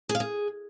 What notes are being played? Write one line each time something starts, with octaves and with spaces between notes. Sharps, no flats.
G#4
F5
G#4